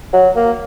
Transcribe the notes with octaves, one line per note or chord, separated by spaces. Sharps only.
F#3
A#3